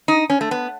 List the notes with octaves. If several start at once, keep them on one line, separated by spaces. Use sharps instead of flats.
D#4
C#4
A3
B3